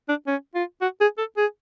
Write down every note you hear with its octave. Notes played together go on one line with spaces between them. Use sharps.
D4
C#4
F4
F#4
G#4
A4
G#4